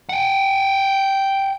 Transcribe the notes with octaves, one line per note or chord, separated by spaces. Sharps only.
F#5 G5